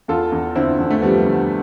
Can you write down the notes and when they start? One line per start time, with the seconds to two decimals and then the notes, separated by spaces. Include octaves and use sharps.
0.08 E2 F4 A4
0.32 E2
0.56 D3 C4 E4
0.79 E2
0.91 A3
1.02 F3 G3 B3
1.26 D3